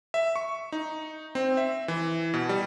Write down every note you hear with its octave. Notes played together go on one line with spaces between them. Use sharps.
E5
C#6
D#4
C4
E5
E3
B2
G3